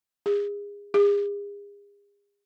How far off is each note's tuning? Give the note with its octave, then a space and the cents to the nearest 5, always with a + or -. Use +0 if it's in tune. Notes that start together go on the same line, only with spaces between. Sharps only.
G#4 -30
G#4 -40